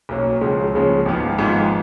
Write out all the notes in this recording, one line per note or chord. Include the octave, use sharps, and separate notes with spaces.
B1 B2 F#3 A#3 C#4
C#2 C#3 F3 G#3 C#4
C#2 C#3 F3 G#3 C#4
G#1 G#2 F3 B3 F4
G#1 G#2 F3 B3 F4